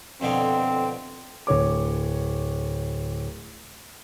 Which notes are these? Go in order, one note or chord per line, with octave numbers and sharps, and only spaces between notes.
F2 B2 D3 C4
D1 C#5 D6